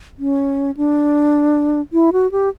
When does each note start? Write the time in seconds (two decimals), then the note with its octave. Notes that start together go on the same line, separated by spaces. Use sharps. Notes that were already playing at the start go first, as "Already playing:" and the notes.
0.19 C#4
0.77 D4
1.93 E4
2.13 F#4
2.32 G4